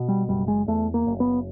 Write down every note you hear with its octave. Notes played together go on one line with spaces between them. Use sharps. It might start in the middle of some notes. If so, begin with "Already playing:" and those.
Already playing: B2
G3
F#1 G3
G#3
E2 A3
A#3
F#1
B3